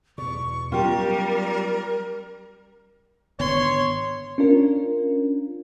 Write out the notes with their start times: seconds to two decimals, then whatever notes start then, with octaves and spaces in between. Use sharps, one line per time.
0.18 E2 B2 D5 C#6
0.72 F#3 G3 B3 C#4 F4 G4 A#4
3.40 G#1 D3 B3 C#5 C6
4.38 C#4 D4 F4 A#4